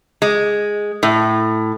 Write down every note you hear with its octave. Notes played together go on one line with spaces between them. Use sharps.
G#3
A2